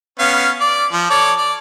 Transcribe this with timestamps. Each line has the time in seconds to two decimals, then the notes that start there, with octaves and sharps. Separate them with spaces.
0.19 B3 C#4 F5
0.61 D5
0.93 F3
1.10 A4 C#5 D5
1.38 D5